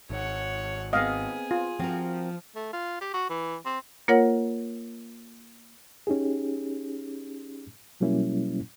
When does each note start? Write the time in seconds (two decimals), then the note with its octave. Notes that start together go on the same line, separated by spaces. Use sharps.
0.10 G#1 C#5 F#5
0.93 B3 C4 G#4 D#5 F5
1.51 F4
1.80 F3 C4 F#4 A#4
2.56 A3
2.73 F4
3.01 G4
3.14 F#4
3.30 E3
3.66 C4
4.08 A#3 F4 A#4 C#5 F#5
6.07 C#4 D#4 G4 G#4
8.00 B2 F#3 G3 A#3 C#4 E4